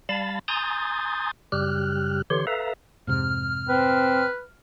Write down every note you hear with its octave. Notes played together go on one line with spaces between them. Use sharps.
G3 F5 A5 B5 A6
G#5 A#5 C6 D#6 G6 A6
F#2 C#3 G3 G4 F6 F#6
D3 E3 G4 C#5 C6
A4 B4 E5 F5 A#5
F2 G#2 C3 F6
C4 B4